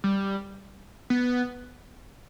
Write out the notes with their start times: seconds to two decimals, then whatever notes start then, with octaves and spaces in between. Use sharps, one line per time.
0.04 G3
1.10 B3